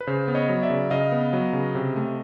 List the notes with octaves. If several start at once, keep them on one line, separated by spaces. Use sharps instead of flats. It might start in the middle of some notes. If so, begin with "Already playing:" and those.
B4
C#3 C5
B3
C#5 D#5
F#3
D5 E5
C#3
C#3 D#5 F5
B3
F#3
C#3
C3
A3